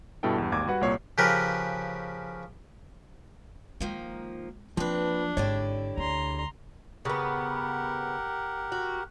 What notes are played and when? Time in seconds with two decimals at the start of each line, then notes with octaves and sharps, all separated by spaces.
0.23 G2 B2 E4 A4 G5
0.38 E2 G2
0.52 G#1 D#2 D6 G#6
0.67 G3 F#4 B4 F#5
0.81 C2 A#2 A#3 C#5 C7
1.18 C#3 F3 G4 A#4 B4
3.80 D#3 F3 G#3 A#3
4.77 F3 A#3 C4 D4 B4
5.37 G#1 D3 E4 G4 C#5 D5
5.97 D2 A#5 C6
7.05 C#3 B3 G4 A#4 F#5
8.72 F#4